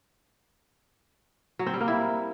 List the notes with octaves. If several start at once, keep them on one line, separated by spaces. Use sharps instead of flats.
F#3
C4
G3
A#3
E4